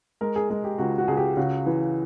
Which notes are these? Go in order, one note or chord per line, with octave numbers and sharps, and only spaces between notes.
G#3 A#4
G#4
G#3 G#4
G4
C#2 F#4
F#4
C#2 G#4
G4
C#3 F#4
E3